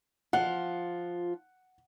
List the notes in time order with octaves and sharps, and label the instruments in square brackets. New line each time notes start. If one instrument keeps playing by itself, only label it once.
[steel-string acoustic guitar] F3 F4 [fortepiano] F#5